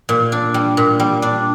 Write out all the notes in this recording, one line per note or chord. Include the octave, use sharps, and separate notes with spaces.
A#2
D4
G3
A#2
G3
D4